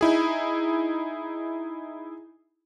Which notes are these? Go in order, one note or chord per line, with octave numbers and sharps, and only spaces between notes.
D#4 E4 G#4